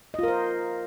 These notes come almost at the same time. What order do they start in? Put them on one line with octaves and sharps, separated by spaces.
D#5 F4 A#4 C5